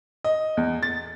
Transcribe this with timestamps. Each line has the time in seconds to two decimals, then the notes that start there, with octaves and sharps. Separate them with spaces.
0.24 D#5
0.57 E2
0.83 A6